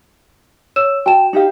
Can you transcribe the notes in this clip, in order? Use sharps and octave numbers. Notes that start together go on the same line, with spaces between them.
C#5 E6 E7
F#4 G5 A5 E7
D#4 G4 F5